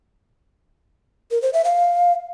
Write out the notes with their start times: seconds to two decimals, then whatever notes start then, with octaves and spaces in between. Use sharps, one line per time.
1.31 A#4
1.42 C5
1.53 E5
1.65 F5